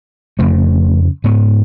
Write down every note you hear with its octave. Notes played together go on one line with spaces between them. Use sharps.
F2 C#3 A3
G#2 B3